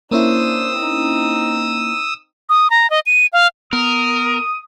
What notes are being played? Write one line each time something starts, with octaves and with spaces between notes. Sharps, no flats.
A#3 C#4 D4 E4 C5 D#6 E6
C4 D#4
D#6
A#5
D#5
D#7
F5
B3 A#4 D#6